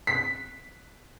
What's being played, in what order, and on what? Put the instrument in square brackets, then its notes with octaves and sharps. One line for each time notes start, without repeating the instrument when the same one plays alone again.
[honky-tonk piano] B6